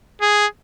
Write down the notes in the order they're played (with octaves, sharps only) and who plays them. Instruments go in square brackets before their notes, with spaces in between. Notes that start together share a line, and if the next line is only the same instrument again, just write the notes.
[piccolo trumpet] G#4